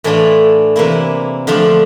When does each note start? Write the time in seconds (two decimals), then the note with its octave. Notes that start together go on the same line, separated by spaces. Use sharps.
0.04 A2 E3 A3 D4 F4
0.76 C3 E3 A#3 E4
1.47 D3 F3 A3 D4 F4